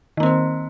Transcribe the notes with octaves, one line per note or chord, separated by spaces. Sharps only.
D#3 A#3 C4